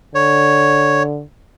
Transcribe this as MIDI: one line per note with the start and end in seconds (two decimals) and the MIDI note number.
0.15 1.22 50
0.15 1.03 73